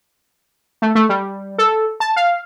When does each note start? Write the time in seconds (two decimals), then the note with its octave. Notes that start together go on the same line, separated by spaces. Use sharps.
0.82 A3
0.95 A3
1.09 G3
1.58 A4
2.00 A5
2.16 F5